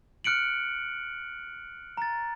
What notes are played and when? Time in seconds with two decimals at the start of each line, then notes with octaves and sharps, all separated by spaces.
0.24 F6 F#6 C#7 D7 F#7
1.97 A#5 A6